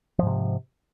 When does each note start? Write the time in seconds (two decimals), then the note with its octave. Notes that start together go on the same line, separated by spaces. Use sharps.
0.19 F3
0.23 G#2
0.27 C3